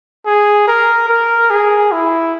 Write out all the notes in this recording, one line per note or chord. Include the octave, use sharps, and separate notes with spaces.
G#4
A#4
A#4
G#4
E4